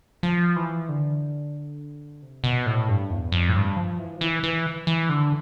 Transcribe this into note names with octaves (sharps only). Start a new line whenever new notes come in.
F3
E3
D3
C3
B2
A2
G2
E2
F2
A2
G2
F3
E3
F3
E3
E3
E3
D3